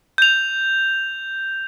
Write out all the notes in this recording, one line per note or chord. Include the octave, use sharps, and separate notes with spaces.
G6 F7